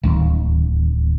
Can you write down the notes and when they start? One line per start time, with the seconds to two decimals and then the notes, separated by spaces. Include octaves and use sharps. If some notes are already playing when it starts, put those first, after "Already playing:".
0.03 D1 D#2